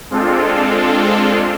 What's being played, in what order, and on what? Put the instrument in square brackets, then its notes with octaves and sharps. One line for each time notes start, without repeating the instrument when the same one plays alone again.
[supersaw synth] G#3 C4 D4 F4 A4